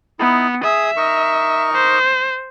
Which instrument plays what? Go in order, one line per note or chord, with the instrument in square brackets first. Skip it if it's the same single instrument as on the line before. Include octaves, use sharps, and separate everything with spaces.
[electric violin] B3 [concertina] D#4 E4
[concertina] G#4 D#6 [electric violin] E5
[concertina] D#4 A#4 C#6
[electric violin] C5